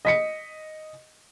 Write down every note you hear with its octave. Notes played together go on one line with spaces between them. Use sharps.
D#5 B6 C#7